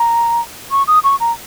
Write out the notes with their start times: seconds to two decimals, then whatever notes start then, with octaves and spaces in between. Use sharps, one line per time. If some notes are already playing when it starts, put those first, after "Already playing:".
Already playing: A#5
0.71 C#6
0.87 D#6
1.04 C#6
1.20 A#5